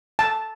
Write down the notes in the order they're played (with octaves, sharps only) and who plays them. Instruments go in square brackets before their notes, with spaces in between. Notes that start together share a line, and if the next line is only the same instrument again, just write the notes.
[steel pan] A5